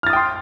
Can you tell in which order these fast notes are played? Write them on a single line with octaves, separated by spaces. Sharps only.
F6 A6 D#6 G5 C6